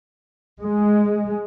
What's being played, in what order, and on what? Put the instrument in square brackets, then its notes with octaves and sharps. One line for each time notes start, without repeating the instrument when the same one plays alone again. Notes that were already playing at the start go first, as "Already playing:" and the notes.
[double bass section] G#3